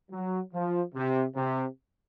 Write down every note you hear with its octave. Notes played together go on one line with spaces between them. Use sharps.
F#3
F3
C3
C3